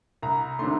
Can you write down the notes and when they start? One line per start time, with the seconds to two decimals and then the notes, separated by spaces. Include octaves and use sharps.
0.22 C2 A#5
0.59 C3 D#3 A3 C6